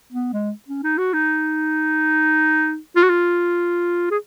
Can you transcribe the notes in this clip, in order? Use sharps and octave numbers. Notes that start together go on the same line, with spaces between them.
B3
G#3
C#4
D#4
F#4
D#4
F4
F#4
F4
G#4